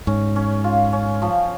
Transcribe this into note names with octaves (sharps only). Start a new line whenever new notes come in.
G#2 C#4
C#4
F4
C#4
F3